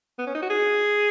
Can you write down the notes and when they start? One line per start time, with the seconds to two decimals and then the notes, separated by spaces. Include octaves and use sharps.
0.19 B3
0.27 C#4
0.35 D#4
0.42 F#4
0.50 G#4